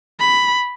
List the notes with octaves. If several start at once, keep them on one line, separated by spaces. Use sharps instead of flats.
B5